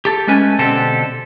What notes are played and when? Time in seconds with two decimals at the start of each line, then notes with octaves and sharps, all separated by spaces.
0.05 G4 A4
0.27 G#3 A3 C#4 B4 G#5
0.59 B2 D3 C4 G4 A4